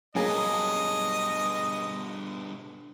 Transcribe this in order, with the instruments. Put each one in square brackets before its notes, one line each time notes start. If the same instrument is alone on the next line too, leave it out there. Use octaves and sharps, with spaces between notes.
[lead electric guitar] G2 B2 [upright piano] F#3 A#3 G#4 [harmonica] D#5